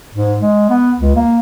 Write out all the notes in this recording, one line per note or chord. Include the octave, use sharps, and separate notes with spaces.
G#2
G#3
B3
C#2
A#3